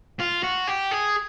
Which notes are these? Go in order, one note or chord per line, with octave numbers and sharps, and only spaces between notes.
F4
F#4
G4
G#4